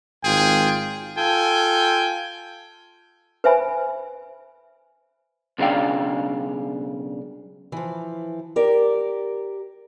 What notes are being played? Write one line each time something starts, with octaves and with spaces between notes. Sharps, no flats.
G#1 F4 G#4 G5
F4 A4 G5 G#5
B4 C5 E5 G#5 B5
B1 C#3 B3 D4 F5 G5
E3 F3
G4 A#4 D5